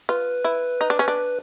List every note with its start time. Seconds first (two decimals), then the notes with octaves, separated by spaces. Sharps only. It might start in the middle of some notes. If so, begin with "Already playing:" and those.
0.09 F4 B4
0.44 E4
0.81 D#4
0.90 D4
0.99 C#4
1.08 D4